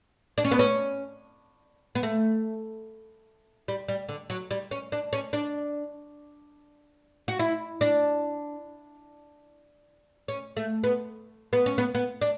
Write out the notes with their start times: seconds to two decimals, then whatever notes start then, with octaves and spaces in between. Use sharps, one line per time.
0.38 D4
0.45 C#4
0.51 B3
0.59 C#4
1.95 B3
2.03 A3
3.68 G3
3.88 G3
4.09 D3
4.30 F#3
4.51 G3
4.71 C#4
4.92 D4
5.13 C#4
5.33 D4
7.28 F#4
7.39 E4
7.81 D4
10.28 C#4
10.57 A3
10.84 B3
11.53 B3
11.66 C#4
11.78 B3
11.95 B3
12.21 D4